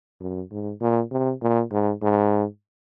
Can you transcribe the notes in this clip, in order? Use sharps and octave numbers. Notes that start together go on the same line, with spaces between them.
F#2
G#2
A#2
C3
A#2
G#2
G#2